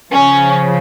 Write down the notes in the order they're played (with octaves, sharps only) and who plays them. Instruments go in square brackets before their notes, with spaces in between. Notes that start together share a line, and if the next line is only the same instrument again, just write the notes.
[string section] C#3 F3 C#4